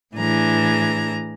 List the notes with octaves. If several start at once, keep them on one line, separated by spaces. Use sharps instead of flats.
A2 E3 D4 G#4 A#5